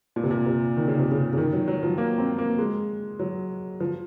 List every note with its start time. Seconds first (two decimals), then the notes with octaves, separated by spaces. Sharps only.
0.16 A#2
0.23 C3
0.31 A#2
0.46 C3
0.77 D#3
0.88 C#3
0.99 C3
1.11 C#3
1.33 C#3
1.37 D#3
1.53 F#3
1.68 F#3
1.83 F3
1.98 A#3
2.18 C4
2.38 A#3
2.59 G#3
3.19 F#3
3.80 F3